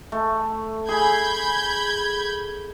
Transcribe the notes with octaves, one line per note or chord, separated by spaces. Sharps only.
A3
G#4 B5 G6 G#6